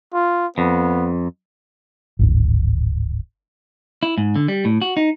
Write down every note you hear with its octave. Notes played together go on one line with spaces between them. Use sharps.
F4
F2 B3
D1 G#1
E4
G#2
D3
G3
A2
F#4
D#4